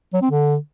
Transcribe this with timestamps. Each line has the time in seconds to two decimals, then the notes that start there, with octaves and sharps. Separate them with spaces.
0.13 F#3
0.22 C4
0.30 D3